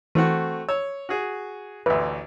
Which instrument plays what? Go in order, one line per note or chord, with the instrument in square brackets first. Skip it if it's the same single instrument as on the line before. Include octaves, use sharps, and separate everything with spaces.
[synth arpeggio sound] E3 [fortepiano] A3 C4 F#4
[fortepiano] C#5 [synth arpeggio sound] E6
[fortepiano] F#4 G#4
[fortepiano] A1 D2 [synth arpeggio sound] B4 E5